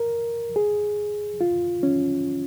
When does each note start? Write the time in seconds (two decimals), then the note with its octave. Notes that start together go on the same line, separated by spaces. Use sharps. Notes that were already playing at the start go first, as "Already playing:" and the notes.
Already playing: A#4
0.56 G#4
1.41 F4
1.83 C#4